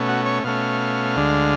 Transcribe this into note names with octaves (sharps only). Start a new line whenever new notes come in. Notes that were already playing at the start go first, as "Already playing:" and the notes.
Already playing: B2 A3 C#4
F#4
C#5
B2 A3 C#4 F5
D2 D3 G#3